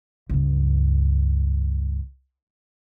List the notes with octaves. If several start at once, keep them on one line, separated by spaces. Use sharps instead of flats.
C#2 G2